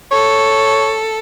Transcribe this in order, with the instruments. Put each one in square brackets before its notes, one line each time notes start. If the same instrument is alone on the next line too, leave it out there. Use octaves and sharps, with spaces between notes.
[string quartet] A4 [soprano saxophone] C#5